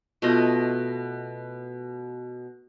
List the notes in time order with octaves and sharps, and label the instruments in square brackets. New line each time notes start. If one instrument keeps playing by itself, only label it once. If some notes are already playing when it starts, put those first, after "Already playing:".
[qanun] B2 A3 F4 D#5